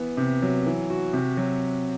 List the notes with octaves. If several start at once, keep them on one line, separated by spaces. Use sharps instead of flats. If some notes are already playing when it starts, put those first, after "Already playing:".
Already playing: E3 B3
C3
F#3
E3
F#4
C3
F#3